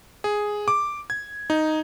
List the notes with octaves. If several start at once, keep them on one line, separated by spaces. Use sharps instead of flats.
G#4
D6
G#6
D#4